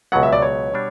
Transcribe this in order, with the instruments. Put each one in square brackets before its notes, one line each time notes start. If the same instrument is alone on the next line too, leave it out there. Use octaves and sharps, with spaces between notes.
[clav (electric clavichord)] C#2 B2 F#3 B3 [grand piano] F#5
[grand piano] E5
D5
C#5
[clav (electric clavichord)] B2 G3 D4